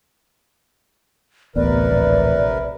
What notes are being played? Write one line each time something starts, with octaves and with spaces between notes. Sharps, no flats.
D1 A1 C3 B3 A#4 B4 D5
A#1